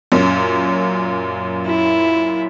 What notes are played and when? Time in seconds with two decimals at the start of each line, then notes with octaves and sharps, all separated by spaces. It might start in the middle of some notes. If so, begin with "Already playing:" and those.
0.12 F#2 A#2 C#4
1.66 E4